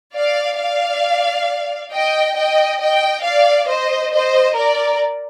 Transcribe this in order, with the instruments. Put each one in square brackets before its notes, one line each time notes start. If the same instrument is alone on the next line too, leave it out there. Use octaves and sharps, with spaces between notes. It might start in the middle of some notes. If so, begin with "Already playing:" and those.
[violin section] D5 F5
D5 F5
D#5 G5
D#5 G5
D#5 G5
D5 F5
C5 D#5
C5 D#5
A#4 D5